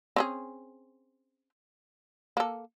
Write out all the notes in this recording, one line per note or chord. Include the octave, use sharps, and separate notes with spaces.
C4 C#4 G#4
A#3 A4